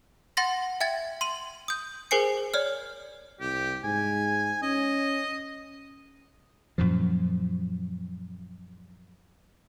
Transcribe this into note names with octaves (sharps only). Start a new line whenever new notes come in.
F#5 C6 A6 A#6
E5 G5 G#6 A6
C6 D#7 F#7
D#6 G6
G#4 A#4 C5 G#5 C7 C#7
C#5 D5 F6
C2 G4
G#2 G#5
C#4 D#5
F#2 A#2 F3